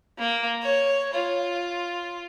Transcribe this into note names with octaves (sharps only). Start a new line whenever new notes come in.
A#3
C#5
F4